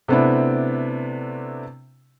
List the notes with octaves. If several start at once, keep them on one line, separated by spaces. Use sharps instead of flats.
C3 A3 B3 C4 D4 E4